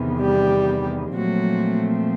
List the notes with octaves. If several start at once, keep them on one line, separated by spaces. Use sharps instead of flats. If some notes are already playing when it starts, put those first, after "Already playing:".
Already playing: E2 C3 D#3 B3
G3 G4
A#2 F3 F#3 A3 C4 F#4